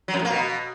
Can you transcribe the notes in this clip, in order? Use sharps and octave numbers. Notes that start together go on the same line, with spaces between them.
F#3
F2
A2
A#3
B2